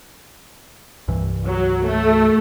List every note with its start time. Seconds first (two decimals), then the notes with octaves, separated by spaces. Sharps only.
1.08 C2 G2 E3
1.46 F#3
1.84 A3